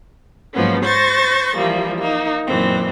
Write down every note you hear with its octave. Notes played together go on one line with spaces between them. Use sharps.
G#2 F3 F#3 A#3 B3 C#4
C5 C#6 G6 A6 A#6
E3 F3 G3 A#3
A#3 D#4
F#2 A#2 D#3 E3 C4